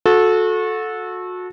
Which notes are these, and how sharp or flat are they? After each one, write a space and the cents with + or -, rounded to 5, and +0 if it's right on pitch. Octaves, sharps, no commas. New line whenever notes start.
F#4 -30 A4 -10